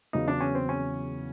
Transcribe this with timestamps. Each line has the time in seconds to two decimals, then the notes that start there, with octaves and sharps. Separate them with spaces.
0.13 E2 C#3 F#3 D#4
0.28 D4
0.40 C#4
0.55 C4
0.69 C#4